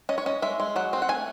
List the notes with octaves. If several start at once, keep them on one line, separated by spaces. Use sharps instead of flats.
C#4 D#5
C#5
C#4 D#5
G#3 E5
G#3
F#3 F#5
C4
F#5
A3 G#5